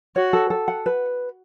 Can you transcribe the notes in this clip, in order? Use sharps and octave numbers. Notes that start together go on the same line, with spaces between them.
F#4 C#5
A4
A4
F#5
B4